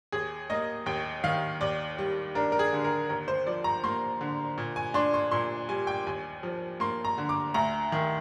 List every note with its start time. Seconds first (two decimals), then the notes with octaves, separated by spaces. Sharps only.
0.12 D#2 G#4
0.50 A#3 D#5
0.86 D#2 G5
1.24 D#3 F5
1.61 D#2 D5
1.98 G3
2.35 D4 A#4
2.52 A#4
2.59 G#4
2.73 D3
2.84 A#4
3.09 D#2 A#4
3.28 C5
3.47 F3 D5
3.64 A#5
3.83 A#3 C6
4.21 D3
4.58 A#2
4.76 G#5
4.94 D4 C6
5.14 C6
5.31 A#2 C6
5.69 G3 G#5
5.87 G5
6.07 D#2 G#5
6.43 F3
6.80 A#3 C6
7.05 A#5
7.18 D3
7.29 D6
7.54 D2 A#5
7.92 D#3